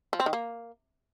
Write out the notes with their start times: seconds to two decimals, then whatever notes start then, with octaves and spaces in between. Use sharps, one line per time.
0.13 F3
0.20 C4
0.26 D#3
0.33 A#3